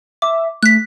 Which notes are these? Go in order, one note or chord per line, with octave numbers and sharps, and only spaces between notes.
E5 D6
A3 F#6 B6